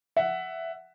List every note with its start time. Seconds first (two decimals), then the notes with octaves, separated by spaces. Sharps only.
0.16 E5 F#5